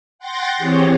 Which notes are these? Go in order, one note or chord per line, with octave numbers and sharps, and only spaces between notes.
F#5 G5 C6 G6 A6 A#6
E3 C4 G4 G#4 C#5